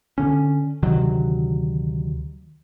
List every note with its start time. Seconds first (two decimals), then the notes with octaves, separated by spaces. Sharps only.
0.18 D3 C#4
0.83 D2 C3 D#3 F#3